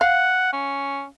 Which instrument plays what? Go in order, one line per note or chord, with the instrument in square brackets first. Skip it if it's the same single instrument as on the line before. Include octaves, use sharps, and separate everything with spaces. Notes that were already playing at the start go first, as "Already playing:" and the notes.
[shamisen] F5 [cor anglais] F#5
[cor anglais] C#4